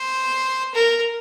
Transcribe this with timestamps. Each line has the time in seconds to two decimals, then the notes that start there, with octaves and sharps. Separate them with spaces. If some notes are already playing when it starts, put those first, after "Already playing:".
Already playing: C5
0.75 A#4